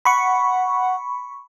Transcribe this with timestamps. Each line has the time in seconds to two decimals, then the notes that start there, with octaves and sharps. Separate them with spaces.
0.05 F#5 B5 C#6